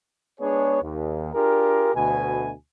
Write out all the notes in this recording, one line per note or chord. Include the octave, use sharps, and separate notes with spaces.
G#3 B3 D4 G#4 C#5
D#2
D4 F4 G4 G#4 A#4
D2 B2 G#5